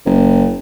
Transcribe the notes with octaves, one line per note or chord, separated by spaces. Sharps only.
F#1